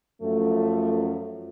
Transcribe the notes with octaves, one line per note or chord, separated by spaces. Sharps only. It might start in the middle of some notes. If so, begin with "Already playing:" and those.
F#2 F3 A3